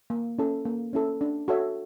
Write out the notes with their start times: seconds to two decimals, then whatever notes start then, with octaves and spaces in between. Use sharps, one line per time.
0.10 A#3
0.38 C#4 E4 A4
0.65 A#3
0.93 C#4 E4 A4
1.21 D4
1.48 F#4 A4 C#5 E5